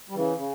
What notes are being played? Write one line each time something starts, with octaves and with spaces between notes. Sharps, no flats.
G3
C#3 E3
C#3